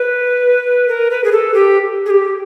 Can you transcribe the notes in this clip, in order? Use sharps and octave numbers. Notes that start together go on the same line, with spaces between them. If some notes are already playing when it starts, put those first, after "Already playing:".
Already playing: B4
A#4
B4
G#4
A4
G4
G#4
G4